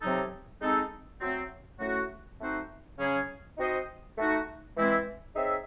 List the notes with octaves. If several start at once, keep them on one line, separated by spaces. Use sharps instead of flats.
C3 F#3 C4 D#4 A4
G#3 C4 D#4 A4
F#3 A3 C4
A2 F#3 A3 C#4 F#4
A3 C4 D#4 F#4 C5
C#3 F#3 C#4 G#4
C4 D#4 F#4 C5 D#5
A3 D#4 F#4
E3 G#3 C4 E4
C4 D#4 G#4 C#5 E5